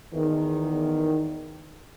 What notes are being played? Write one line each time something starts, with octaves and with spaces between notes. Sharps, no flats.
E2 D#3